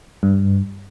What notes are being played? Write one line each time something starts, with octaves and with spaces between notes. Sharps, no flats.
G2